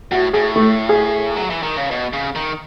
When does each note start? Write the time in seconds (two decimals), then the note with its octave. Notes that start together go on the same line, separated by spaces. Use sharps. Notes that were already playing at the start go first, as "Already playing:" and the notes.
0.12 A2 F#4
0.33 A2 G#4
0.56 A3
0.89 G#4
1.36 F#3
1.50 E3
1.63 D#3
1.77 C#3
1.91 B2
2.13 C#3
2.35 D#3